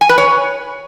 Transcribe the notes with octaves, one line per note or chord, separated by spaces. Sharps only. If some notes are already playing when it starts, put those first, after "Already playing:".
G#5
B4
C#5